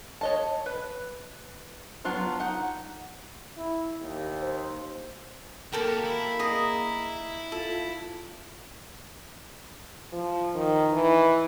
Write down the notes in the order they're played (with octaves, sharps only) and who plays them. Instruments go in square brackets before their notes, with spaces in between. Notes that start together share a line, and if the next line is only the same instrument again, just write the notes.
[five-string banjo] C#5 D#5 A5
B4
F#3 B3 D4 F4 C5
D#4 F#5
[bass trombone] E4
D#2
[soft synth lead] C5
[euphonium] A#3 [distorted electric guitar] F#4 G4 [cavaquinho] A4 A#4 G5
[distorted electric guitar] E4
[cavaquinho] G#4 D#5 A#5
[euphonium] F4 [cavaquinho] A4
[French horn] F3
D#3
E3